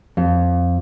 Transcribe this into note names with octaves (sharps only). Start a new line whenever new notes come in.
F2